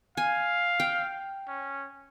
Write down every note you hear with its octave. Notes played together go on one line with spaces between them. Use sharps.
F5 G#5
G5
C#4